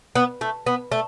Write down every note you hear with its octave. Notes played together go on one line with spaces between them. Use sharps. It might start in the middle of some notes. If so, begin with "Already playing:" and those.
B3
A3
B3
A3